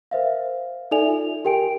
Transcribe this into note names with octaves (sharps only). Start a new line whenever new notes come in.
A#4 C5 E5 F5
D#4 A4 D5 E5 G#5 F7
F4
G4 A#4 G5 G#5 D7